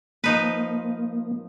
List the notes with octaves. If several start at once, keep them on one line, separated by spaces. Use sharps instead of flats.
F3 A#3 D#4 B4